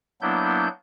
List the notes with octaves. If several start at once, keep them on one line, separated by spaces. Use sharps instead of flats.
F#3 A#3 B3 D4 E4 G6